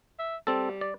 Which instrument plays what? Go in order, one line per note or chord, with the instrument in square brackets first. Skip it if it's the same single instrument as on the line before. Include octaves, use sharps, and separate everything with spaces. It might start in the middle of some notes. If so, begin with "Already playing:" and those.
[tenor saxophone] E5
[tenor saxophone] G3 [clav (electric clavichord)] C4 A4
[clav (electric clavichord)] D5